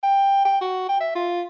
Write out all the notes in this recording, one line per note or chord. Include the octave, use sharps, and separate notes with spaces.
G5
G5
F#4
G5
E5
F4